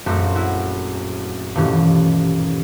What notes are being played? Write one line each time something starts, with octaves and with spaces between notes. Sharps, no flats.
A#1 F#2 A3 C4 F#4 C#7
E4 F#4
D#1 G2 B2 E3 A3 C#4